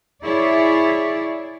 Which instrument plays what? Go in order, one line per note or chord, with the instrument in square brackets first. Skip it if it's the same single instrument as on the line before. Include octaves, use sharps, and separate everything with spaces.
[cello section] E4 G#4 C#5 D5 E5